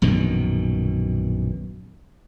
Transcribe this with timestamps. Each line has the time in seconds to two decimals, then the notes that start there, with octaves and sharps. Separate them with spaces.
0.02 A#1 F#2 B2 D#3